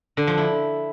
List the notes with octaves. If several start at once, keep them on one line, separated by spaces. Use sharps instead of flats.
D3
F3
E4